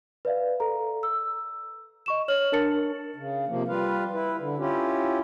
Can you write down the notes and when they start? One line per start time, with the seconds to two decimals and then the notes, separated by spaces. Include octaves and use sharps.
0.25 B4 D5 E5 F5
0.60 A4 A#5
1.03 E6
2.06 D#5 C#6 E7
2.28 C#5 F6 F#7
2.52 D4 A#4 A5 A6 C#7
3.16 C#3
3.48 C3 F3 A#3
3.68 G3 F4 B4 F5
4.12 E4 B4
4.39 D3
4.58 C#4 E4 F4 G4